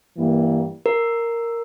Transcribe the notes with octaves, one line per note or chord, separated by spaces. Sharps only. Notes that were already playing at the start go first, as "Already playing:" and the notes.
G2 E3 G3 A#3
A#4